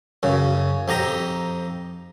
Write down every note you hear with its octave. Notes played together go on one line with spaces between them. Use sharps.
F#2 C#3
F2 D#4 G4 A#5